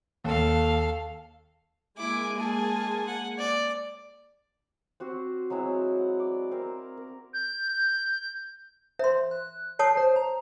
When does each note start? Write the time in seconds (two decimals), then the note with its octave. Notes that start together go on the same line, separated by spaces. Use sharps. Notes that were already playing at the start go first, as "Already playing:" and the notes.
0.24 D#2 A4 F5
1.98 G#3 A#3 E4 G#5 D6
2.38 G#4 A5
3.07 F#5
3.38 D5
5.00 C4 F#4 G4 C5
5.50 F#3 G#3 C4 E4
5.98 F#5
6.20 D5
6.51 C4 A#4
6.97 A#4
7.33 G6
8.99 C5 E5 C6
9.31 F#6
9.79 C#5 A5 D#6 C7
9.97 C5
10.16 A#5